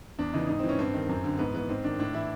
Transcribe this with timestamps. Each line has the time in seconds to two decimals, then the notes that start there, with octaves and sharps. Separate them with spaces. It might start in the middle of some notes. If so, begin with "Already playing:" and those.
0.19 E2 D4
0.34 C#3 E3 D#4
0.49 G#2 D#4
0.59 E3 C4
0.69 C#4
0.79 G2 C4
0.94 D#3
1.09 F#2
1.24 D3
1.39 G#2 B3
1.54 E3 B3
1.69 G#2 C4
1.84 D#3 D4
1.99 A2 D4
2.14 E3 E4